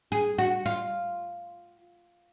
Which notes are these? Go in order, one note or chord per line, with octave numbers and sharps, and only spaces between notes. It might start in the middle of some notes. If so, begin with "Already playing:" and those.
G#4
F#4
F4